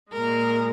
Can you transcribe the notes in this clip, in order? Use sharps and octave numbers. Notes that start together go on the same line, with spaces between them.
A#2 G#3 A#4